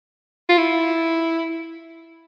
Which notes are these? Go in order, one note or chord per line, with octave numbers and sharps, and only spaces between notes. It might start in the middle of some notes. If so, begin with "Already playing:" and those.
F4
E4